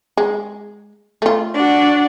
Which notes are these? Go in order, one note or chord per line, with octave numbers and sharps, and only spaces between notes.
G#3
A3 F4
D4 F#4